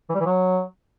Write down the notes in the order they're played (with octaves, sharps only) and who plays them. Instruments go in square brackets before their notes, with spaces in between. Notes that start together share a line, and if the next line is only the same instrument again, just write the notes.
[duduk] E3
G3
E3
F#3